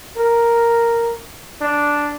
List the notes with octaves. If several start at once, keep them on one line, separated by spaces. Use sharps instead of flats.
A#4
D4